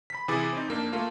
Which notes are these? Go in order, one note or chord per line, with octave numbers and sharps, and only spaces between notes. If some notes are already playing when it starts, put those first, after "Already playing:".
B5 B6
C3 E3 E4 G#4 D6 A6
C4 D#4
F2 A#3 D4
A3 A#3 F4